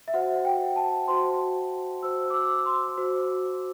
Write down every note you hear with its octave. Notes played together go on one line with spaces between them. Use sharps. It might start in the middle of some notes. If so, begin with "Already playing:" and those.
E5
F#4 C5 F#5
G5
A5
F#4 C5 C6
F#4 C5 E6
D6
E6
C6
F#4 C5